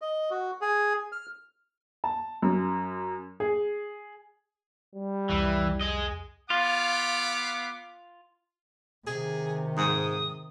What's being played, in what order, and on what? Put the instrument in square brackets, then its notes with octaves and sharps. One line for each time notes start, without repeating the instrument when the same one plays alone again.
[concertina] D#5
F#4
G#4
F6
[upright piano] A5
F#2
G#4
[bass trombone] G3
[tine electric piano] C2 F2 [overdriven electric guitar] E3
[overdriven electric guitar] G#4 D#5
[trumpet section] B3 F5 D6 [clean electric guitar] F4
[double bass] C3 D#3 [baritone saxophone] G#4
[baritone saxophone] G#2 [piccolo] D#6